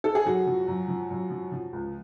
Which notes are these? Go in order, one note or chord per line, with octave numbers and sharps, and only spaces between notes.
A4
G#4
F#2 F#4
F3
F#2
F3
F#2
F3
F3
C#2